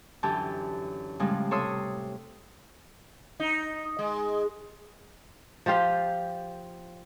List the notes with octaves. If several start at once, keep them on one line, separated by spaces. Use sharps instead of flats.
F#2 D3 E3 G4 A5 G6
A2 C#3 F3 G3 G#3
C3 A4 C#5 E5 C6 D#6
D#4
G#3
F3 F4 G4 F5